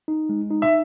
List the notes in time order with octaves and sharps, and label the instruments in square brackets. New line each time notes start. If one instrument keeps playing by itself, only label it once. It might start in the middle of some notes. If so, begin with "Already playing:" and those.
[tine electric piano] D#4
G#3
D#4
[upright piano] E5